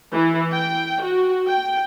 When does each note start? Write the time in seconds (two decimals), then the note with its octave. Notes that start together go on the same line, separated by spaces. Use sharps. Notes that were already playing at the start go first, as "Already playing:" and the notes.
0.13 E3
0.52 G5
1.02 F#4
1.47 G5